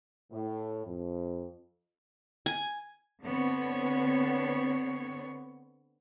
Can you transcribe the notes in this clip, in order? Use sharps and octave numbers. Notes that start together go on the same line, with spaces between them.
A2
F2
G#5
D3 B3 C4 C#5